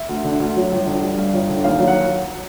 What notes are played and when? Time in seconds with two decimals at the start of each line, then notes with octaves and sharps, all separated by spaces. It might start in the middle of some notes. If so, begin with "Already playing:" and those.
Already playing: E5
0.09 D2
0.25 D3
0.40 D2
0.56 F#3
0.72 G1
0.86 D3
1.02 G3
1.18 G2
1.34 G1
1.49 D3
1.64 D#2 F5
1.79 F#3
1.88 F#5